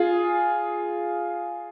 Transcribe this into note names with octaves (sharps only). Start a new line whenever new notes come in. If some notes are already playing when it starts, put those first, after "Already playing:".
Already playing: F4 G#4